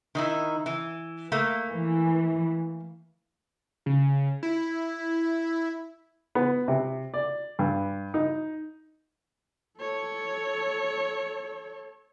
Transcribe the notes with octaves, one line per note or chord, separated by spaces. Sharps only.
D#3 D#4 E4
E3
A3 A#3
E3
C#3
E4
B3
C3
D5
G2
D#4
A4 C#5